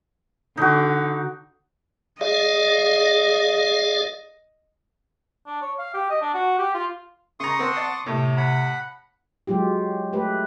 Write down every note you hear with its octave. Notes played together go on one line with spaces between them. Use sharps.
D3 D#4 F#4
G#4 D5 D#5 F5
D4
C#5
F5
G4
D#5
D4
F#4
G4
F4
C#3 A#5 C6 C#6 D#6
C4 F#5 A5
D5
A2 C3 C#5
F#5 B5
F#3 G#3 F4 G4
A3 G4 B4